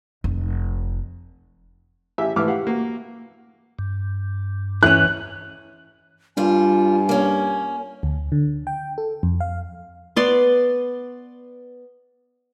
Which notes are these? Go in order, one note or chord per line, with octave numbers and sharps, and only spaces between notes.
F1
A1 G4 E5 G#5
G#2 E3 A3 E5 D6 F6
G4 F5 F#5
A#3 F#4
G2
E3 C#4 F#6
G2 G3 F4 G#5
A#3 C#4
D2
D3
G5
A4
F2
F5
B3 D5 C6